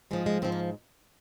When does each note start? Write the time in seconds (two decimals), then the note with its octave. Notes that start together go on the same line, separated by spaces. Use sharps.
0.11 G#2 F3 G#3
0.26 G#3
0.42 G#2 F3 C4
0.52 A#3